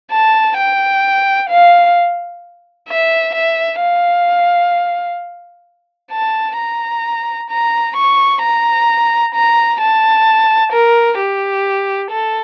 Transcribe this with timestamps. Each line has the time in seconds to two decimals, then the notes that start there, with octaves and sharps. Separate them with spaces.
0.12 A5
0.57 G5
1.50 F5
2.89 E5
3.35 E5
3.80 F5
6.12 A5
6.57 A#5
7.50 A#5
7.96 C#6
8.42 A#5
9.34 A#5
9.81 A5
10.72 A#4
11.18 G4
12.11 A4